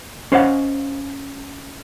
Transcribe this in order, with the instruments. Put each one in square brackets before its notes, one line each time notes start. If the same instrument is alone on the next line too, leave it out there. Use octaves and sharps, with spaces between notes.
[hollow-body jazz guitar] C#4 C5 D#5 F5 F#5